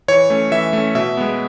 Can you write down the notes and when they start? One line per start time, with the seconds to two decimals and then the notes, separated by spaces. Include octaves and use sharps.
0.08 E3 C#5
0.30 A3 C#4
0.52 E3 E5
0.73 A3 C#4
0.95 B2 E5
1.17 G#3 B3